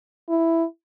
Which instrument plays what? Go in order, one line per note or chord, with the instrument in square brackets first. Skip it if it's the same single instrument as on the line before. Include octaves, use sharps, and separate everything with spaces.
[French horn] E4